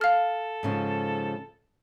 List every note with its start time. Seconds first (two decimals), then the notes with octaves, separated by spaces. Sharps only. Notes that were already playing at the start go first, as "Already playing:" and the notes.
0.01 A4 F5 F6
0.63 G#2 C#3 F3